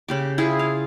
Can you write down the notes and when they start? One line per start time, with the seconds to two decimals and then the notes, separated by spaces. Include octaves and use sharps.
0.08 C#3 G4 D6
0.38 E4 F4 G#4
0.59 F5